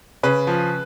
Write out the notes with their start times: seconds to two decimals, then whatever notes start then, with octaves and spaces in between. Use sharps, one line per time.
0.23 C#3 B4
0.47 F3